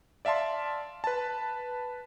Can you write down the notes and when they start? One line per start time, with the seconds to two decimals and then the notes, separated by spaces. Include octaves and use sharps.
0.25 D5 E5 F5 A5 C6
1.04 B4 A5